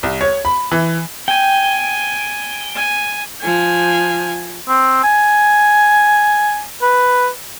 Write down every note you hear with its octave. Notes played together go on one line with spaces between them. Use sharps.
C2
C#5
B5
E3
G5 G#5
G#5
F3 G#5
C4
G#5
B4